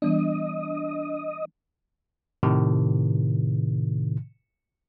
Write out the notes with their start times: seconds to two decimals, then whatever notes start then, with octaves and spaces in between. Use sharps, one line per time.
0.02 E3 G3 B3 D4 D#5
2.43 A2 C3 D#3